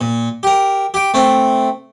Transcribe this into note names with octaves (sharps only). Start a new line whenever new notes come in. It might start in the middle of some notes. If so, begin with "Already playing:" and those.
A#2
G4 A#4
G4 G5
A3 C4